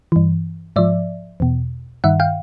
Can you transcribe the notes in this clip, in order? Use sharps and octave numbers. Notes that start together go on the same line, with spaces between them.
G2 E3
G#2 F3 D5 E5
E2 B2
G2 D#3 E5 F#5
F5 G5